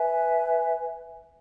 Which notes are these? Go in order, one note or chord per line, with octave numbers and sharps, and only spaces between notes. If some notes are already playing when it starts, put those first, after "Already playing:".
Already playing: B4 E5 G#5